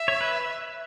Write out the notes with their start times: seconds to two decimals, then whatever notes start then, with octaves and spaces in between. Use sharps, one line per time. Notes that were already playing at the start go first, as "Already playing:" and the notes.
Already playing: E5
0.08 C#5
0.21 B4